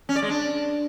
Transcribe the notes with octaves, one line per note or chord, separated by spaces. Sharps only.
C#4
D5
G#3
D4